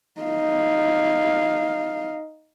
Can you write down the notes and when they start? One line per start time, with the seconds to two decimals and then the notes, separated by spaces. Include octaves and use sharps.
0.21 D#4 F5